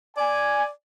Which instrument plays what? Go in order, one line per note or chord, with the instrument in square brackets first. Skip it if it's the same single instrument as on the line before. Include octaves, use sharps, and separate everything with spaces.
[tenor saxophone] D5 [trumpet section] G#5